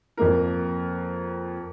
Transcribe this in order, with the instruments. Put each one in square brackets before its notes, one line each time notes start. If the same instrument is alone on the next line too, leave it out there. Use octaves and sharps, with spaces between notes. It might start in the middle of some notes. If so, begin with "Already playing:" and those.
[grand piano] F2 A#3 A#4